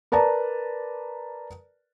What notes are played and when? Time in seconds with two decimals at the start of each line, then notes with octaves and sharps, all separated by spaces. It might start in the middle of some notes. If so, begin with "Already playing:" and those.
0.12 A#4 B4 D5 A5 A#5